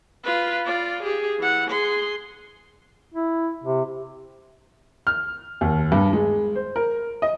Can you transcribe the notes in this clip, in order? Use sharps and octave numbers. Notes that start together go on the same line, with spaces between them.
F4 B4
F4 D5
G4 G#4
E3 F#5
G#4 C6
E4
C3
F6
D#2
G2
G#3
C5
A#4
D#5